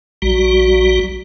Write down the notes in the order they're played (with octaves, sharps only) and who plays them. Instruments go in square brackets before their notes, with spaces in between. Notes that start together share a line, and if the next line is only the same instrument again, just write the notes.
[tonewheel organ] A#1 G3 F#4